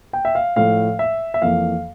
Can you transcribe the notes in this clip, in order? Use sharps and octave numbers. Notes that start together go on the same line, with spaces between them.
G5
E5
F5
A2 F3 A3 F5
E5
E5
F2 E3 A#3 F5